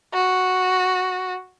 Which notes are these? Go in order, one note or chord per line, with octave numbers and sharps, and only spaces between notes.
F#4